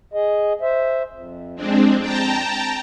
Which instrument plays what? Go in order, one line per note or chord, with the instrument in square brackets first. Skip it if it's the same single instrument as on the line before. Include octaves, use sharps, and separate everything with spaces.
[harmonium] G#4 D#5
C5 E5
F2
[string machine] G#3 C4 D4
G5 A5 A#5